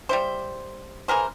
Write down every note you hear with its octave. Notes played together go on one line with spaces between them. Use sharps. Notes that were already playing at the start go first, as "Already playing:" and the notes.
G3 E4 C5
E3 G#4 A#4 C5